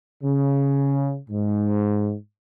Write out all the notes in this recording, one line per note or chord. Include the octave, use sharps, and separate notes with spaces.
C#3
G#2